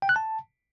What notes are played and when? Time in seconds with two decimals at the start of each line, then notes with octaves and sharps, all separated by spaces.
0.02 G5
0.09 F#6
0.16 A5